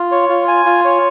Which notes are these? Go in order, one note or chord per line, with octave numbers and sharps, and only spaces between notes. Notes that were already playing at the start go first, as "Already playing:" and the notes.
Already playing: F4
C#5
F4
G#5
F4
C#5